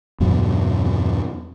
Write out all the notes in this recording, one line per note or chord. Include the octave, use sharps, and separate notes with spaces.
E2 G2 B2 F#3